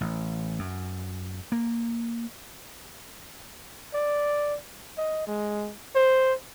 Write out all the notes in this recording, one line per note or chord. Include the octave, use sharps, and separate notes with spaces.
A1
F#2
A#3
D5
D#5
G#3
C5